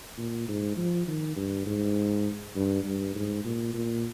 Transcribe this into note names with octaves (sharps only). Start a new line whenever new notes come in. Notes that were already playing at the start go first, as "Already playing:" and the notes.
A#2
G#2
F3
D#3
G2
G#2
G2
G2
G#2
A#2
A#2